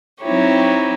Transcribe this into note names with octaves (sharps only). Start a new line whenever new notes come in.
F#3 C4 D#4 E4 G4 C#5